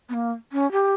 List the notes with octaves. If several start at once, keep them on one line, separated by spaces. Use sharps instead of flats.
B3
A#3
C#4
G4